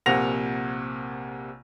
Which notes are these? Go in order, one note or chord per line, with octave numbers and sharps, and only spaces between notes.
A#1 C3 A#3 F#5 A#6 F7